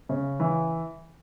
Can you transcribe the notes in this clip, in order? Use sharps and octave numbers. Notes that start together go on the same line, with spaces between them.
C#3
E3